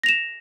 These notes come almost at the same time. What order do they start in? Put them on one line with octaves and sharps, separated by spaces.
A#6 F7 E7